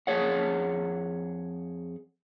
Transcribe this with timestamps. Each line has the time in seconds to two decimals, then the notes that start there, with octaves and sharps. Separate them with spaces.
0.07 F2 G#4 C#5 F#5